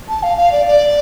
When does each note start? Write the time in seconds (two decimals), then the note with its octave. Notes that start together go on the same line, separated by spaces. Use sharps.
0.09 A5
0.23 F5
0.37 F5
0.52 D5
0.67 D5